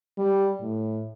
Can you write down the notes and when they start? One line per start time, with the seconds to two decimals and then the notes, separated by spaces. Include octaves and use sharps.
0.18 G3
0.61 A2